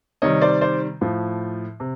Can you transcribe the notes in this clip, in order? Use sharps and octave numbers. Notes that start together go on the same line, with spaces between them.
C3 D#3 G3 C#5 D#5
C5 D5
C5 D5
A2 F3
C3